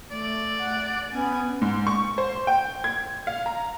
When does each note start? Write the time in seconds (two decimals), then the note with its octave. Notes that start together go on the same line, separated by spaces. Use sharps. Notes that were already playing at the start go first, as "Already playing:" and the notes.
0.11 A3 D5
0.60 F#5
1.12 B3 C#4 G#5
1.62 G#2
1.87 C#6
2.18 C5
2.47 G5
2.84 G#6
3.27 F5
3.46 A#5